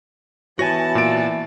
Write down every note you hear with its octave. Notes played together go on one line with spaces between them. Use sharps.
E3 B3 F#4 C#5 G#5 A5 A#6
A#2 D7